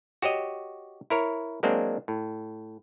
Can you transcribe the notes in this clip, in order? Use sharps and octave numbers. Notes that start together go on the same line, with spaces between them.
F#4 G4 C#5 D#5
E4 A#4 C#5
F#3 G#3 A#3 C4 D4
A2